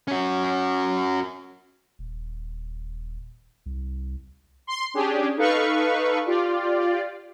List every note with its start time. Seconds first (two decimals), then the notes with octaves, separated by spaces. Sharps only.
0.08 C#4 F#4
1.99 D#1
3.66 C2
4.67 C6
4.94 C#4 D4 G4 G#4
5.37 D#4 A4 B4 F5 C#6
6.26 F4 G4 D5